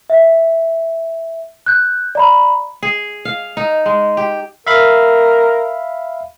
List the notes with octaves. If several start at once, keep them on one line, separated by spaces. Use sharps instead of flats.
E5
F#6 G6
D5 A#5 B5
G#4
F5
D#4
G#3
G4
A#4 E5 F5 B5